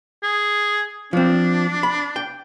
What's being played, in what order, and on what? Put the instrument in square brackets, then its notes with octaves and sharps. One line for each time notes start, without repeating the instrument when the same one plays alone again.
[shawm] G#4
[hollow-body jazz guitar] F3 C4 [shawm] D4
[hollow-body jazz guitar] B5
G5